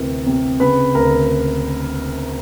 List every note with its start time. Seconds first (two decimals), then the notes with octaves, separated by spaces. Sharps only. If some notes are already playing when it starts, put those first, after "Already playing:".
Already playing: D2 C3 E3 A#4
0.26 C3
0.60 C#3 B4 B5
0.95 D2 A#4 A#5